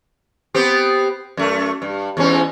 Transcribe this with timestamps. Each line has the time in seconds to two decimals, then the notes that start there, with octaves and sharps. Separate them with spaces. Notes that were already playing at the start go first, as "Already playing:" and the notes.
0.54 B3 C4 G4
1.37 F#2 A3
1.82 G2
2.17 E2 G#2 C#4